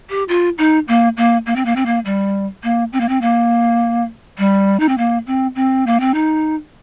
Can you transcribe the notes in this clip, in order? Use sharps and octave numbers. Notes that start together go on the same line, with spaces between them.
G4
F4
D#4
A#3
A#3
A#3
C4
A#3
C4
A#3
G3
A#3
C4
A#3
C4
A#3
G3
D#4
C4
A#3
C4
C4
A#3
C4
D#4